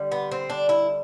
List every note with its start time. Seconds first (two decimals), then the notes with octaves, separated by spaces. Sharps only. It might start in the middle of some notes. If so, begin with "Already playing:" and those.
Already playing: D3 G3
0.12 B3
0.31 C4
0.50 D4
0.69 E4